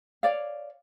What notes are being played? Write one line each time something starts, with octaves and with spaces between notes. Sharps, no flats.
C#5 D5 F5